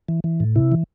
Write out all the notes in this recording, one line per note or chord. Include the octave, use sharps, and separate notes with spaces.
E3
E3
A2
C3 E4
E3